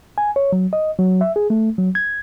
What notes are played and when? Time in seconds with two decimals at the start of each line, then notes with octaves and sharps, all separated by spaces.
0.18 G#5
0.36 C#5
0.52 F#3
0.73 D#5
0.99 F#3
1.21 E5
1.36 G#4
1.50 A3
1.78 F#3
1.95 G#6